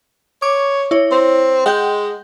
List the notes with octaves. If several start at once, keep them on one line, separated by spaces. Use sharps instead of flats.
C#5 D6
E4 C#5
C4
G#3 F#5 G5 G6